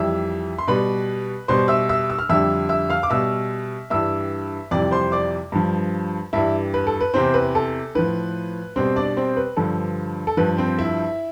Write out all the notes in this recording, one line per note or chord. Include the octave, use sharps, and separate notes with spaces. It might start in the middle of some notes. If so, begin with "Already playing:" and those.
Already playing: F2 E3 G3 E5 E6
C6
B2 G3 B4 B5
B2 G3 C5 C6
E5 E6
E5 E6
E6
F6
F2 D3 G3 E5 E6
E5 E6
F5 F6
D6
B2 G3 E5 E6
G2 E3 G3 E5 E6
F2 C3 E3 G3 D5 D6
C5 C6
D5 D6
G2 F3
G2 E3 G3 E4 E5
B4
A4
B4
E2 C3 E3 C4 C5
B4
A4
A2 F3 B4
B2 G3 C4 C5
D4 D5
C4 C5
B4
G2 D3 F3 A4
A4
G2 F3 B4
C4 C5
E4 E5